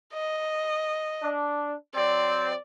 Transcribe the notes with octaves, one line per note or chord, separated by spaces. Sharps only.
D#5
D4
F#3 C4 D5